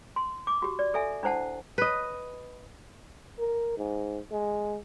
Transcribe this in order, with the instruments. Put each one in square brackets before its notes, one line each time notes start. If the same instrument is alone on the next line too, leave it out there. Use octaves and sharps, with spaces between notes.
[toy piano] C6
D6
F#4 G4
D5
A4 E5 G#5
D4 E4 C5 F#5 A5
[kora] B4 D#5
[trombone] A#4
G#2
G#3